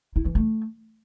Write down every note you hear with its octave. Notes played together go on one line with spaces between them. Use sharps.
E4
E3
A3